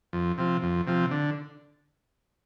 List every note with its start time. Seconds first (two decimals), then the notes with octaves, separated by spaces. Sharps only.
0.13 F2
0.38 C3 F3
0.62 F2
0.87 C3 F3
1.11 D3